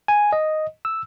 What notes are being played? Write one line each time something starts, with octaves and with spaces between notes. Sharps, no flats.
G#5
D#5
E6